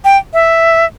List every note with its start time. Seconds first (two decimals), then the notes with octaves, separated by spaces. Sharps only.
0.04 G5
0.34 E5